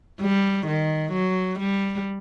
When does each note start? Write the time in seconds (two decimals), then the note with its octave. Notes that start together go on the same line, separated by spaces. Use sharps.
0.21 G3
0.67 D#3
1.13 F#3
1.59 G3